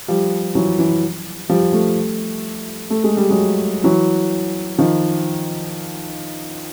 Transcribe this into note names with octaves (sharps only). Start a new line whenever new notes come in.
F3 G3
E3 F#3
E3
F3 G3
G3 A3
A3
G#3
G3
F#3 G#3
E3 F#3
D#3 F3